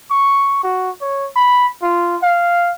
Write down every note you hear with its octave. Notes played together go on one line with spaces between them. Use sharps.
C#6
F#4
C#5
B5
F4
F5